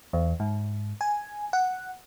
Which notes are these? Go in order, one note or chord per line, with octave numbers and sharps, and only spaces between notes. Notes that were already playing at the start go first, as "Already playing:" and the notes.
E2
G#2
G#5
F#5